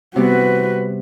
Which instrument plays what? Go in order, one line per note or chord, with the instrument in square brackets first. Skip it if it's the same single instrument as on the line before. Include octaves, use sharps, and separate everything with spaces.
[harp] C3 G3 B3 [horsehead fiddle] F#4 B4